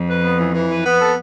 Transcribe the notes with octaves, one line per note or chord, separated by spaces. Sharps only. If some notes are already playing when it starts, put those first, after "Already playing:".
Already playing: F2
B4
B3
E3
E3
B4
B3
A4